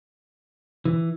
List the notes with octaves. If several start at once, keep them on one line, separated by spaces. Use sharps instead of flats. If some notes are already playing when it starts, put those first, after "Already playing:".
E3